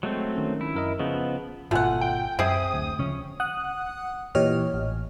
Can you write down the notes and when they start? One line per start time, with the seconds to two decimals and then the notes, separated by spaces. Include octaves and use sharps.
0.03 F#3 G#3 A3 C4
0.36 D#3 C#4
0.61 E4
0.75 F#2 A#4 D#5
0.99 C#3 F3 B3 D#5
1.71 G#1 B2 A3 F4 F#5 G#5
2.01 G5
2.39 F#2 C4 G#4 E5 G5 D#6
2.74 D2
2.99 C#3 F3 C#4
3.40 F#5 D#6 F#6
4.35 A#2 E3 G4 C#5 D#5 F6
4.74 A1